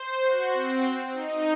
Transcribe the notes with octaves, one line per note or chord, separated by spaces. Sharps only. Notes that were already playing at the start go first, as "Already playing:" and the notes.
Already playing: C5
F#4
C4
D#4